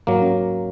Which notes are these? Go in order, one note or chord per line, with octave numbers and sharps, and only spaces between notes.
G#2 F#3 A#3
C#4